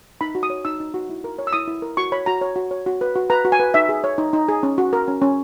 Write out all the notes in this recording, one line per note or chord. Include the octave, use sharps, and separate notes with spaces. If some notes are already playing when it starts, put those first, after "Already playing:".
D#4 B5
F#4
D#6
C#5
D#4 E6
D#4
F#4
E4
A#4
C#5
E6
E4 D#6
E4
A#4
F#4 C#6
C#5 B5
F#4 A#5
C#5
F#4
C#5
F#4
B4
F#4
B4 A#5
F#4
G#5
B4
D#4 E5
G#4
C#5
D#4
D#4
G#4
C#4
F#4
A#4
C#4
C#4